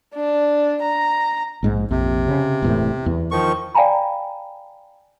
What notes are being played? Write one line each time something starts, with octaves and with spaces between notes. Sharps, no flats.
D4
A#5
A#1 G#2 G#3
A#1 F2 C3
C#3
E1 E2 A2
E2
D#3 F3 C#6
D5 F5 G5 G#5 A#5 B5